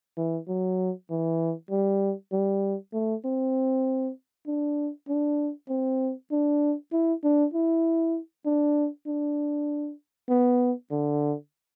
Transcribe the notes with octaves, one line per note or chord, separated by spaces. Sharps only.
E3
F#3
E3
G3
G3
A3
C4
D4
D4
C4
D4
E4
D4
E4
D4
D4
B3
D3